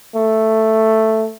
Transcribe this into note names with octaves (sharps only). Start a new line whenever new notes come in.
A3